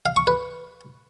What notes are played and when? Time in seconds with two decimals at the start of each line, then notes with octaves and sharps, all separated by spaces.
0.06 F5
0.16 C#6
0.27 B4